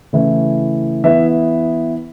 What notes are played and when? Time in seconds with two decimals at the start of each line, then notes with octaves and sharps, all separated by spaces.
0.13 C#3 E3 A3 E4
1.04 E3 B3 E4 E5